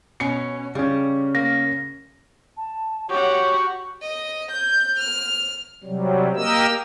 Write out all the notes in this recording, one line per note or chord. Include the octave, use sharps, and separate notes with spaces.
B2 C#4 C#7
C#3 G3 C#4
A#3 A#6
A5
F#4 G4 C#5 F#5
D#5
G6
F6
C3 F#3 G3
A#3 G4 A#4 D#5 E6